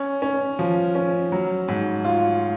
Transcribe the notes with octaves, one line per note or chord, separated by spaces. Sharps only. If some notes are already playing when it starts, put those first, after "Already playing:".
Already playing: C#4
C#4
F3
C#4
F#3
G#2
F4